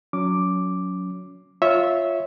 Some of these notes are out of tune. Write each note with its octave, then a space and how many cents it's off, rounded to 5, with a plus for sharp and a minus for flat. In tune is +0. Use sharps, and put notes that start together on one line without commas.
F#3 -20 C#4 +25 D6 +0
F4 +0 C#5 +0 E5 -15